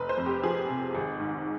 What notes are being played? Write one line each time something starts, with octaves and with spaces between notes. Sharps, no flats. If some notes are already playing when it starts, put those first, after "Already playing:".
Already playing: F1 B4
C5
F2
G4
F3 G#4
C3
G#1
G#2